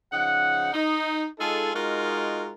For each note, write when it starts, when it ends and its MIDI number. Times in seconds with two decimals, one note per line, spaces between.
0.13 0.73 49
0.13 0.73 53
0.13 0.73 63
0.13 0.73 78
0.73 1.27 63
1.39 1.71 56
1.39 1.71 63
1.39 1.71 65
1.39 1.71 68
1.39 1.71 69
1.75 2.53 56
1.75 2.53 63
1.75 2.53 65
1.75 2.53 66
1.75 2.53 70